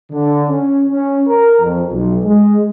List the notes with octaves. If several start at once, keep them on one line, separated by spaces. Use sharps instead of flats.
D3
C#4
C#4
A#4
F2
B1
G#3